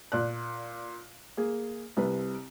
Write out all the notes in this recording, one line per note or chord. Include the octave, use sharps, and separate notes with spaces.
A#2 D5 F#6
A#3 G#4
C2 C3 B4